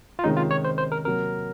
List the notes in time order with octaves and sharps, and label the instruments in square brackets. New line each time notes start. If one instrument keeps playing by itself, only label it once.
[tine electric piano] F4
[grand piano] C3 D#3 G#3 C#4 [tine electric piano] D#4
[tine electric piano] F4
C#5
C5
C5
A#4
[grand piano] C3 F#3 A#3 [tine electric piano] A#4